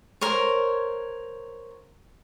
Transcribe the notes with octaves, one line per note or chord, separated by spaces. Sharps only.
A#4 C5 C#5